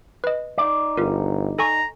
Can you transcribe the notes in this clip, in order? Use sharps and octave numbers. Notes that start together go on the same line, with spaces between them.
B4 D#5
D#4 D5
G1 F4 A#4
A4 G#5 A#5 C#6